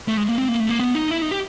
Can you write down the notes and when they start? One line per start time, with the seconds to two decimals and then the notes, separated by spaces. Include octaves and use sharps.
0.08 A3
0.17 G#3
0.29 A#3
0.38 C4
0.48 A#3
0.60 A3
0.69 A#3
0.79 B3
0.95 D#4
1.11 E4
1.22 D#4
1.31 G4